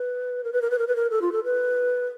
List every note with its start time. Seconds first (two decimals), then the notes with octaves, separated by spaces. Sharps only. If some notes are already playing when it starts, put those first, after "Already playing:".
Already playing: B4
0.44 A#4
0.53 B4
0.62 A#4
0.70 B4
0.79 A#4
0.87 B4
0.96 A#4
1.10 A4
1.22 F4
1.32 A4
1.44 B4